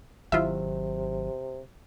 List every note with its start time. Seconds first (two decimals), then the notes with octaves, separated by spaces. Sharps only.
0.32 G#1 C3 D#3 F#3 E4 F4 E5